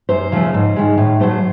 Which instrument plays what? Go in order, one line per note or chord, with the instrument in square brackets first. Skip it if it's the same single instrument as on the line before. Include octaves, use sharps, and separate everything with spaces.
[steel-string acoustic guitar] F#2 C5
C#3 F3 A3
G#2
D#3 G#3
A2
F#3 A3 C5